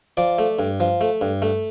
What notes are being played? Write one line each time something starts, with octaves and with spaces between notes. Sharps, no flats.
F3 D5
A3
G2
F3
A3
G2
A3